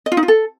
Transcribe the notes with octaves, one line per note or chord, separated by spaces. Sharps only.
D#5
F4
D#4
F4
A4